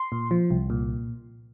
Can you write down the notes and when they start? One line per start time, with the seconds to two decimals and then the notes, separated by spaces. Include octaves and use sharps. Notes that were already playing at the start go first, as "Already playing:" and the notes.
Already playing: C6
0.12 A#2
0.31 F3
0.51 C2
0.70 A#2